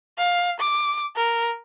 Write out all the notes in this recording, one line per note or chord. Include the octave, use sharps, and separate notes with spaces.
F5
D6
A#4